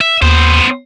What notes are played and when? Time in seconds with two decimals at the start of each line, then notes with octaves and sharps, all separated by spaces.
0.01 E5
0.22 D#2 B3 C5